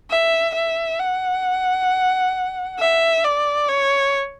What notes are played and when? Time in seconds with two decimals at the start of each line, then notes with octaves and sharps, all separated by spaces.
0.11 E5
0.55 E5
1.00 F#5
2.79 E5
3.24 D5
3.68 C#5